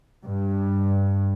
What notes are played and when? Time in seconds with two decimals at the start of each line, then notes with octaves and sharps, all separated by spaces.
0.23 G2